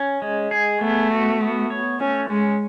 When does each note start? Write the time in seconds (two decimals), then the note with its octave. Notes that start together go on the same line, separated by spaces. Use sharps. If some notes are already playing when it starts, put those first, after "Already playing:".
Already playing: C#4
0.22 G#3
0.51 G#4
0.81 A3 B3
1.11 F#4
1.40 B3
1.70 C#5
2.00 A3 C#4
2.30 G#3 C#4